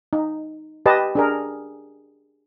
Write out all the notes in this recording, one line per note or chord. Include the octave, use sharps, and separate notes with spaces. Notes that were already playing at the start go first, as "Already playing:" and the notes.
D#4
G4 B4 D#5 A5
D4 G#4 A#4